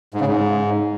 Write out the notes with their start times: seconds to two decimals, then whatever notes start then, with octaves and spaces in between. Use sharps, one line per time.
0.14 G#2
0.20 C#3
0.27 G#2